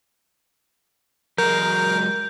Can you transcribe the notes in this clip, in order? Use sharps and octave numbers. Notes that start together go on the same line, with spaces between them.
F#3 G#3 A#4 G6